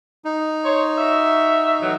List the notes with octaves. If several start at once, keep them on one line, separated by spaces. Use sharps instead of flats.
D#4
C5 C#5
F#4 E5
A2 E3 F#3